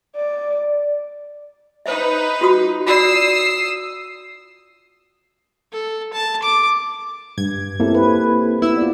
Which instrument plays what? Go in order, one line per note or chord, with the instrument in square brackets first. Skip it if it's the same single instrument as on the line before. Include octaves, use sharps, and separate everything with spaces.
[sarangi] D5
[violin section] D#4 B4 [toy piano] C5 E5
[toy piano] F4 F#4 D#6
[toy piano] F4 F#4 D5 [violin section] D#6 E6 C7
[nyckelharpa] A4
A5
D6
[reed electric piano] G2 [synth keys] G#6
[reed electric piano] A#3 E4 A4 [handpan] C4 G4
[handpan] B4
[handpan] B3 [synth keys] E4 E6
[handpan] F4 D5